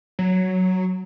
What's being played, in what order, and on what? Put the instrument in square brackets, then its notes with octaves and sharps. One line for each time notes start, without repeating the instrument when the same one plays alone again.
[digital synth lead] F#3